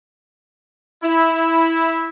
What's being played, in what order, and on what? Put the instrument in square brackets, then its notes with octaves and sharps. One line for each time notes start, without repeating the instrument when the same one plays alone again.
[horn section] E4